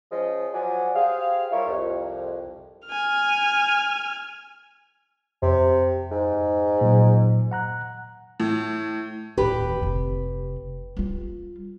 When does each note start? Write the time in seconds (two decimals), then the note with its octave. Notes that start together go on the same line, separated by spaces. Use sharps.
0.11 F3 G#3 C#4 D#5
0.54 F3 F#3 D5 F#5 G#5
0.95 G4 G#4 C5 F5
1.52 G3 E4 F4 A#4 C#5 E5
1.67 C2 F2
2.88 G#5 F6
5.42 F2 C3
6.11 G#2
6.81 A#2 F#3
7.51 F#5 A#5 F#6
8.40 A2
9.37 D1 D#3 G4 B4
9.80 F1 C3
10.97 G3 F4